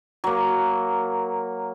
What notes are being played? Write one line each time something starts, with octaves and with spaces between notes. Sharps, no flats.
F#3 A#3